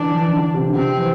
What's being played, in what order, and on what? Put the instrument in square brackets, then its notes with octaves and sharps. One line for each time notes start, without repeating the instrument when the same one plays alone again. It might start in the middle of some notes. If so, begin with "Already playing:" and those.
Already playing: [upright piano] D3 E3 [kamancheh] D4
[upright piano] E3
E3
D3
C3
D3
[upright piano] C3 [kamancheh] C4
[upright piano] E3